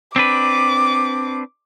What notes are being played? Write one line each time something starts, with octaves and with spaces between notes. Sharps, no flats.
C4 D4 B4 D6